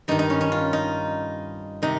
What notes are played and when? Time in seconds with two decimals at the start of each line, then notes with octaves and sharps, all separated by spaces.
0.08 G2 D#3 D#4
0.19 D#4
0.30 C#4
0.41 C#4
0.52 F4
0.73 D#4
1.82 C3 D#3 D#4